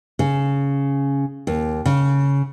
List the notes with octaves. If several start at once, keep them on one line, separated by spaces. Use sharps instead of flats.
C#3
D#2
C#3